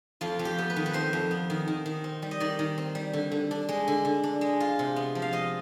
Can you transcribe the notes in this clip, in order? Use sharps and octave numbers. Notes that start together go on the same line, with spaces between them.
F2 F4
F2
G4
B3
B4
D#3
B4
F2 C5
F2
B3
D#3
D#3
D#3
C4
G3
D#5
D#3 D5
D#3
C4
G3
D3
D3
D4
G#3
D3
D3
D4
G#3
F4
C3
B3
F3
F5
F4 D#5